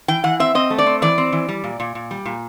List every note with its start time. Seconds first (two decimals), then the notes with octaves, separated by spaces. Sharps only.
0.08 E3 G5
0.24 E3 F#5
0.40 C4 E5
0.55 C4 D#5
0.70 A3
0.78 D5
0.87 C4
1.02 E3 D5
1.18 C4
1.32 E3
1.49 G3
1.64 A#2
1.80 A#2
1.95 A#2
2.11 G3
2.26 A#2